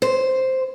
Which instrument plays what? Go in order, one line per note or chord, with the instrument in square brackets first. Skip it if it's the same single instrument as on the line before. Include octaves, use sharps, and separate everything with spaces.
[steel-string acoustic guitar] C5